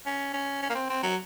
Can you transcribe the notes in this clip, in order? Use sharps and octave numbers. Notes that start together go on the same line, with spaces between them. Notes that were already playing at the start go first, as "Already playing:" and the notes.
C#4
C#4
C#4
A#3
C4
C4
F#3